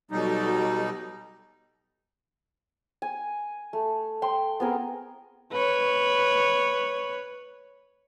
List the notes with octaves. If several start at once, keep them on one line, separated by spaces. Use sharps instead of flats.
B2 F#3 G3 D#4 G4 A4
G#5
A3
G5 C6
B3 C4 G#4 A#4
B4 C#5